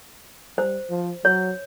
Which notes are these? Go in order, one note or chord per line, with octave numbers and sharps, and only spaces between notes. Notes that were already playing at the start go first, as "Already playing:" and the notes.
G3 C5
F3
F#3 C#5